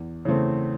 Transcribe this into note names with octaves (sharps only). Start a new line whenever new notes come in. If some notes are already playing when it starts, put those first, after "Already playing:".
Already playing: E2
C#3 E3 A3 C4